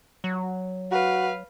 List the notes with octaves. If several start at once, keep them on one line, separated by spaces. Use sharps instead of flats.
F#3
F#4 B4 F5